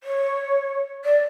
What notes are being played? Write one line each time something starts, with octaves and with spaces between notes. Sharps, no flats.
C#5
D5